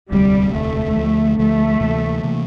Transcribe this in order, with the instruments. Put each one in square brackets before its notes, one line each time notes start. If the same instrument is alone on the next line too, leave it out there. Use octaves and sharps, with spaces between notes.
[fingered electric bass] E1 D2 C3 [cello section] G3
[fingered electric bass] E1 D2 C3 [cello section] A3
[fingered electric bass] D2 D3 F3
[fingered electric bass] D2 D3 F3 [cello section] A3
[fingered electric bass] D2 C3 E3 A#3
C3 E3 A#3